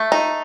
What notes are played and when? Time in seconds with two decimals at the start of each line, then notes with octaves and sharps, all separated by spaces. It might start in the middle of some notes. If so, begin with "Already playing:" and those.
Already playing: A3
0.12 D#4